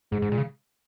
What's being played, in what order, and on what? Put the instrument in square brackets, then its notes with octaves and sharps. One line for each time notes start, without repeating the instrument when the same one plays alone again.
[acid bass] G#2 [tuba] G#3
[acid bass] G#2
A#2
C#3